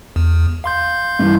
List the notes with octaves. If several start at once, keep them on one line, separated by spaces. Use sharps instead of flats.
E2
F5 C6 G6
G2 E3